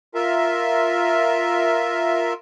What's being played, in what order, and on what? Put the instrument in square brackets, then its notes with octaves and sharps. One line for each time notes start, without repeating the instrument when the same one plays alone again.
[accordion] F4 A#4 E5